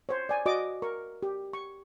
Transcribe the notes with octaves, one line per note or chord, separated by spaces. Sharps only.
C5 C#5
D5 G#5
F#4 D5 D#5 D6
A#4 C#6
G4
C#6